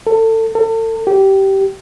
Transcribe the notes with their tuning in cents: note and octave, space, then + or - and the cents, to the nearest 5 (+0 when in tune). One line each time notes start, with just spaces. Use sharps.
A4 +25
A4 +35
G4 -15